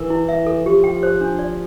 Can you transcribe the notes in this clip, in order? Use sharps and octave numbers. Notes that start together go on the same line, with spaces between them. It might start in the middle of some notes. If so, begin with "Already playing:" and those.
Already playing: E3 A#4
E4
E5
A4
F3 G4
G5
C5
D4
D5